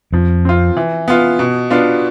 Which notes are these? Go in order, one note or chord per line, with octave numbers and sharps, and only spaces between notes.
F2 F3
C4 F4
E3
B3 F4
B2
B3 D4 F4